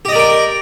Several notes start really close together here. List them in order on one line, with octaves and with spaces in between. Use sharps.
G4 D#5 D5 A#4 G5